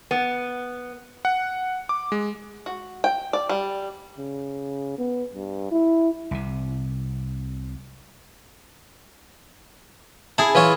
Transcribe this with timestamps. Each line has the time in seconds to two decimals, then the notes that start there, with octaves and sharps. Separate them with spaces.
0.11 B3
1.25 F#5
1.89 D6
2.12 G#3
2.66 F#4
3.04 G5
3.33 D5
3.49 G3
4.18 C#3
4.98 B3
5.34 G2
5.72 E4
6.31 C2 C3
10.38 E4 G#4 A5
10.55 E3 F4 C#5